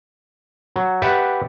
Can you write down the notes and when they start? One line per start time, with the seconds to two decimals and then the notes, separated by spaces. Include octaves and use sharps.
0.76 F#3
1.02 G4 B4 D5 E5 F#5